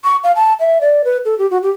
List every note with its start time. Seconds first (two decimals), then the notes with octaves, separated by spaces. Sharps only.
0.04 C#6
0.24 F5
0.36 A5
0.60 E5
0.81 D5
1.04 B4
1.25 A4
1.39 G4
1.51 F#4
1.63 G4